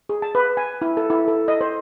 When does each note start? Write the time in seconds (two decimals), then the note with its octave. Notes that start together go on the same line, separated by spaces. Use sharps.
0.09 G#4
0.22 A5
0.35 B4
0.57 G#5
0.82 E4
0.97 A4
1.10 E4
1.28 A4
1.48 D#5
1.61 C5